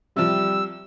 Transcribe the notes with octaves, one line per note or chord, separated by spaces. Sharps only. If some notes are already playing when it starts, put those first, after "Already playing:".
C3 F3 G3 E6